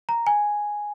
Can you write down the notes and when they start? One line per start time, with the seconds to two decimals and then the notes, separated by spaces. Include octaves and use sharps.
0.09 A#5
0.27 G#5